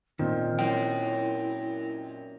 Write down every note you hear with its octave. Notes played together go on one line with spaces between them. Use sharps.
A#2 D#3 C4 D#4 F6
F#2 E4 G5